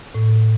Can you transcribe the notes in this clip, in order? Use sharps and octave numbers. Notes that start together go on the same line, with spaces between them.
A2